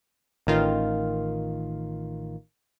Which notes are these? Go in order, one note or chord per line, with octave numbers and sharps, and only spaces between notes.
A1 D#3 F4